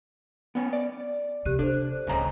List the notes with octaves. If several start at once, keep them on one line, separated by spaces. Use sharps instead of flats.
B3 C#4
D5
C3 G4 F#6 D#7
D4 A4 C5
D1 C#2 G#2 C#3 A#5